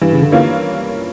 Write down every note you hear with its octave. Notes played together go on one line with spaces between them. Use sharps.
G2 E3
C#3
D3
E3 A#3 C#4 F4